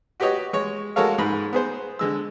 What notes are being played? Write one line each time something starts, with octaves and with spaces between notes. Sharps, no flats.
F#4 G4 B4 C#5 D#5
G#3 C#5
G#3 F#4 A4 A#4 C#5 F5
G#2 G#3 B5
B3 G#4 C5
D3 G#3 E6